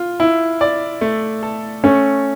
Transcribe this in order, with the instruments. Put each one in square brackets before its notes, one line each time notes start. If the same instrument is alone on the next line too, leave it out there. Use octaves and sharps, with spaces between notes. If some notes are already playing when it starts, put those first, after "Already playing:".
Already playing: [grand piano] F4
E4
D5
A3
A4
[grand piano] A3 [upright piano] C#4